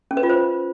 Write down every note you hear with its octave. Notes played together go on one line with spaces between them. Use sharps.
C#4
B4
F4
C5